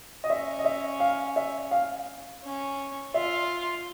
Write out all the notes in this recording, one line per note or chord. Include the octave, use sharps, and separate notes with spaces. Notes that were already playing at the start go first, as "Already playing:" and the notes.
D#5
C#4 E5
D#5
E5
F5
E5
F5
C#4
F4 E5